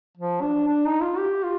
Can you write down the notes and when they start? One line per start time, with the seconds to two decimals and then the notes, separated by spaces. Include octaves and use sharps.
0.17 F3
0.41 D4
0.67 D4
0.85 D#4
1.01 F4
1.18 G4
1.43 F4